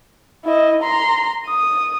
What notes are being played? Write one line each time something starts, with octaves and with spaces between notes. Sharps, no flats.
E4 D#5
A#5 C6
D#6